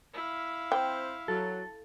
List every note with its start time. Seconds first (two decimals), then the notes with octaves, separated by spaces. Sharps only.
0.13 E4 F5
0.72 C4 C5 G5
1.28 F#3 A4